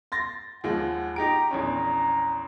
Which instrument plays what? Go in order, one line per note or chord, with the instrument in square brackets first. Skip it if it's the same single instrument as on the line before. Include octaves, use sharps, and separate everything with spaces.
[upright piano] C6 A6 A#6
[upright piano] D#2 F3 G#3 [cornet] F#5
[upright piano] D#4 G4 D7 [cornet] A#5
[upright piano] A#1 E2 C#4 [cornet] A#5